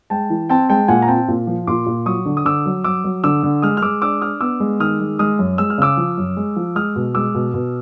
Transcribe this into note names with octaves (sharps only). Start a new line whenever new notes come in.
G#3 G5 A5
E3
C4 G5 A5
G#3 G5 A5
A#2 F#5 G#5
A#5
C4 G5 A5
A#2
F3
A#2 C6 D6
A#2
F#3 C#6 D#6
D3
D#6
D3 D6 E6
F#3
F#3 D6 E6
F#3
D3 D6 E6
D3
G#3 D#6 F6
F6
G#3 D6 E6
D4 D6 E6
D4 D#6 F6
B3 D6 E6
G#3
D#3 D#6 F6
G#3
G#3 D#6 F6
F#2
G#3 E6
F6
C#3 D6 E6
F3
F#2
G#3
F3
G#3 D#6 F6
B2
G#3 D6 E6
B2
B2